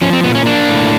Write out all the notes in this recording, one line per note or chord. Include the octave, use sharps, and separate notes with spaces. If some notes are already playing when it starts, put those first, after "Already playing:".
F3 C#4
C4
A#2 B3
C#4
A#3 D4
A2